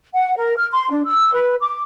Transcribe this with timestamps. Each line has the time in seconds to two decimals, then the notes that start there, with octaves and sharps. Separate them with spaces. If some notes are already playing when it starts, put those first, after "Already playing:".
0.14 F#5
0.37 A#4
0.57 F6
0.71 C6
0.91 D4
1.07 E6
1.34 B4
1.61 D6